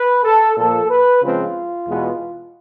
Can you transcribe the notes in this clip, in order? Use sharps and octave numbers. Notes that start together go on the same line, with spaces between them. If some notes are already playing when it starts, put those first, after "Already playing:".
Already playing: B4
A4
A#2 F3 A#3 A4
B4
C#3 F3 G#3 C4 F4
E2 B2 G#3 B3